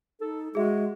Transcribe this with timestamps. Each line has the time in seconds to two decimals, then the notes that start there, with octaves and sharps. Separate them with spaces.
0.21 D#4 A4
0.55 G#3 F#4 G#4 E5